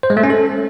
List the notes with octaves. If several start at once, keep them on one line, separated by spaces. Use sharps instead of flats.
C5
G#3
A3
C#4
A4